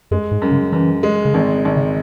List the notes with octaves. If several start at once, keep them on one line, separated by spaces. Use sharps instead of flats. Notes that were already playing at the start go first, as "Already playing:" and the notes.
F#2 G#3
G#2
F#2
C#3
F#2 E3
G#3
C#3
G#1 E3
G#1
C#3